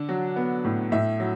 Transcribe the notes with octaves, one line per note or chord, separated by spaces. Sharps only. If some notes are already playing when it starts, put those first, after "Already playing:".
Already playing: D3 D4
F#3
B3
A2
A2 E5
F#3